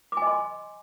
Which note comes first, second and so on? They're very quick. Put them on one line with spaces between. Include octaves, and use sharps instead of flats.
D6 G#5 D#5 C6